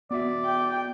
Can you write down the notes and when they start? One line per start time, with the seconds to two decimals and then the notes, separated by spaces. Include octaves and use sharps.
0.11 B3 F#4 D5 E5
0.46 G5